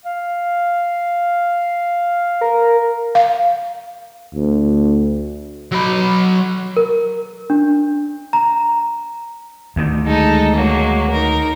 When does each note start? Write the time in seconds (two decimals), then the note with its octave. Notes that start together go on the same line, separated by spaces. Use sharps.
0.05 F5
2.41 A#4
3.15 F5
4.34 D2
5.72 F#3 B5
6.77 A#4
7.50 D4
8.33 A#5
9.76 D2 D#3
10.05 G#3 D#4 A4
10.56 F#3 G#3 A#3
11.08 D#4 A#4